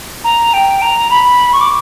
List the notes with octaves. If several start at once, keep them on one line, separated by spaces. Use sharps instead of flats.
A#5
G5
A#5
B5
C#6
D6